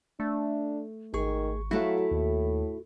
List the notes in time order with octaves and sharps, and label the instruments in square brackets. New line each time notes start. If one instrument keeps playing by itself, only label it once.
[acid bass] A3 [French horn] D4
[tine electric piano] G#1 C#6 [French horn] D#3 [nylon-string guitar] G#4
[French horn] F#3 [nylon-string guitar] A3 E4 [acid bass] F#4 [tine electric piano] E5 F5
[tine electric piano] D#2 [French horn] A2